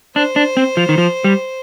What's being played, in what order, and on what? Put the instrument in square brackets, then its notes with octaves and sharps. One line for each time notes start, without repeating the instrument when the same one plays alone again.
[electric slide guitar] D4 [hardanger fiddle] C5
[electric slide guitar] D4
C4
F3
D#3
F3
G3